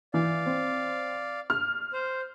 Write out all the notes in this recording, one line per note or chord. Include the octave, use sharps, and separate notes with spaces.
E3 D5 F5
C4
F6
C5